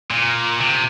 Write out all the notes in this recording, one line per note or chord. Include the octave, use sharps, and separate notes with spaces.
A#2
C3